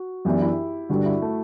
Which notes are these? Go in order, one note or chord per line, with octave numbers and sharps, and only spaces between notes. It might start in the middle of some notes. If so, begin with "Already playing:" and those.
Already playing: F#4
F#2 E3 B3 D4 G4
E4
G2 D3 G3 D4 F#4
E4
A3